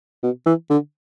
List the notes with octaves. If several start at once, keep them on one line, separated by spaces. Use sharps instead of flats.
B2
E3
D3